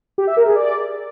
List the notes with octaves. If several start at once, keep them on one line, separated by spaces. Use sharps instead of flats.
G4
E5
A#4
G#4
D5